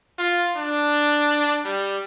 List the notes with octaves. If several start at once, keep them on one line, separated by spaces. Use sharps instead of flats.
F4
D4
G3